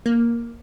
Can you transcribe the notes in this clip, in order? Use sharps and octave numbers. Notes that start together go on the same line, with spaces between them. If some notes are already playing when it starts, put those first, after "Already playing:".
A#3